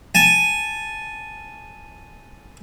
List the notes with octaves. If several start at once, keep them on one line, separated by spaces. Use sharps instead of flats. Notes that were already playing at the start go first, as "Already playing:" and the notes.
G#5 A5